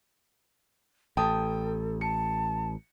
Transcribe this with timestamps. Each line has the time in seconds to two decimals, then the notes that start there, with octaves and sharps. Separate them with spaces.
1.17 A1 A4 G5 A5 D#6
2.01 A5 C#7